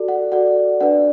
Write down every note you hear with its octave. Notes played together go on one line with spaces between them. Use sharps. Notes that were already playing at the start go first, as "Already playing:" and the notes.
Already playing: F#4 A4 D5
F#5
F#4 A4 D5 F#5
D4 B4 D5 F#5